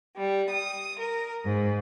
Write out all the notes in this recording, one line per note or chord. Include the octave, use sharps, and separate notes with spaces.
G3
D#6
A#4
G#2